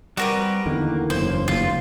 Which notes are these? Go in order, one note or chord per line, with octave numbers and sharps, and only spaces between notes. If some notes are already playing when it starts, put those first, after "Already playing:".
G3 C4 F#4 G4 A#4 B4
E2 D3 D#3 A#3
F#1 C5
F1 D#2 F4